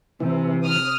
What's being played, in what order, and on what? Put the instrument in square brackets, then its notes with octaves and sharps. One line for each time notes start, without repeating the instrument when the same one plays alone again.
[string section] C3 [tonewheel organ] E3
[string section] D#6 F6